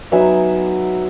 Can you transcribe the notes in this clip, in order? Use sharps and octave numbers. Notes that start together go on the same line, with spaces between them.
F#3 B3 D#4 E5 G#5